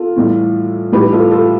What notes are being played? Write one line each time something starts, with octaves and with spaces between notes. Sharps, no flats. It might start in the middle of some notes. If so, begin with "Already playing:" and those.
Already playing: F4 A4
A2 E3 G3
A2 E3 G3 G4 B4
F4 A4
F4 A4